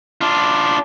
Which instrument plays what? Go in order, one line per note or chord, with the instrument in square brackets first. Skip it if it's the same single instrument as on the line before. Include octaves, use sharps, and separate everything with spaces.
[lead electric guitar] D4 F4